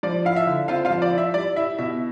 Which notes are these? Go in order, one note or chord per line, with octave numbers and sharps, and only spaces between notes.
F3 D5
E4 F5
E5
D3
C4 F4 F5
F4 F5
F3
D5
E4 E5
G3 D5
E4 E5
B2 E5